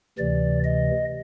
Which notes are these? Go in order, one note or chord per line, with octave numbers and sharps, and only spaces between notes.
D2 C3 E3 D5
D#5